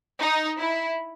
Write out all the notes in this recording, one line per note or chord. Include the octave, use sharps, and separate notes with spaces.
D#4
E4